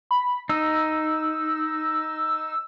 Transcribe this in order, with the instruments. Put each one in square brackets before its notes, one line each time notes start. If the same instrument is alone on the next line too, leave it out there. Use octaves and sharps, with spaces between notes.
[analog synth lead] B5
[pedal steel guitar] D#4 [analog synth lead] E6